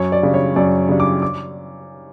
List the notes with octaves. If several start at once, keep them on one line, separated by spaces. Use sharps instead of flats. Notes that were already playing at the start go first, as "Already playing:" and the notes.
Already playing: F#2 C#5
D5
C#3 G3 D4
C#5
F#2 D5
C#3 G3 D4
D6
D6